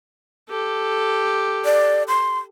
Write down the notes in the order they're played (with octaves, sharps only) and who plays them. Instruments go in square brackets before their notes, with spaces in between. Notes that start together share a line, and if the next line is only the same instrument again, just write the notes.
[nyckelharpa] G4 A4
[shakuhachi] D5
C6